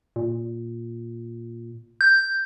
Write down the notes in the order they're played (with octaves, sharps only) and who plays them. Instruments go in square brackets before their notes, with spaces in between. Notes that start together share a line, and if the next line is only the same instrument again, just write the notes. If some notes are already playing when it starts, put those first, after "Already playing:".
[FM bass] A#2
[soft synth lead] G6